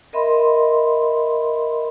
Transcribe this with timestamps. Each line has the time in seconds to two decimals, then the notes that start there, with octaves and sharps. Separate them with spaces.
0.13 A#4 D#5 E5 B5 C6